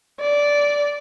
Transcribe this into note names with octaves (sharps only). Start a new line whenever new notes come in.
D5